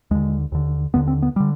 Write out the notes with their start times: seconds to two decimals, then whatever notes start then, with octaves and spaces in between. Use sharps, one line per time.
0.11 D#2 D3 G#3
0.52 D#2 D3
0.94 D#2 D3 B3
1.08 C4
1.22 B3
1.36 D3 G3